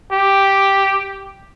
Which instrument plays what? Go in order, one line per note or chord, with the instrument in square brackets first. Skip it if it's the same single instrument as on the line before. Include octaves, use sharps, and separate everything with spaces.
[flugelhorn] G4